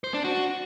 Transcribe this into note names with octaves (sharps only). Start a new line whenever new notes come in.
C5
D4
F#4